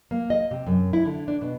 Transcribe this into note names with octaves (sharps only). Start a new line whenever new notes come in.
A#3
D#5
C3
F#2
E4
D3
D4
B2